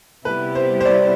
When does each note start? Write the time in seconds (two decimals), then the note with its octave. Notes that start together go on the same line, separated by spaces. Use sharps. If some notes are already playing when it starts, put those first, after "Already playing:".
0.25 C3 G3 B3 E4 G4 B4
0.55 C5
0.81 C5
0.85 D5